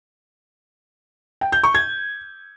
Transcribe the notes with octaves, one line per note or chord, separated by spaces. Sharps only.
G5
G6
C#6
G#6